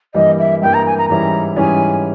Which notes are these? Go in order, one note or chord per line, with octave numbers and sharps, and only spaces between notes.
G2 E3 G3 A#3 D#5
E5
G2 E3 G3 A#3 G5
A#5
G#5
A#5
G#2 E3 G3 C#4 E4 A#5
G#2 E3 G3 C#4 E4 G#5